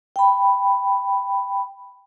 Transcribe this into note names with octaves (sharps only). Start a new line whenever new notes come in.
G5 B5